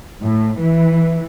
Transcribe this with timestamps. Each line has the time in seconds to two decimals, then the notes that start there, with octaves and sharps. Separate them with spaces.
0.22 A2
0.59 E3